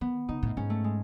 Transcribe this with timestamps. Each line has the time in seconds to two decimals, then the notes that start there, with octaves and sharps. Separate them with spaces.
0.01 D#3 B3
0.29 C#3 D#4
0.43 A2
0.57 G#2 C#4
0.70 A3
0.84 G#3